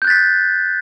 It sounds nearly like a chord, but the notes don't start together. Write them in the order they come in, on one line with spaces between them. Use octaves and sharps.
G6 F#6 A6 B6